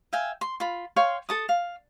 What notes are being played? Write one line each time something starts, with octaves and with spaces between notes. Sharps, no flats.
E5 F5 G5 G#5
C6
F4 B5
C#5 F5 G5 C6
A4 A5 D#6
F5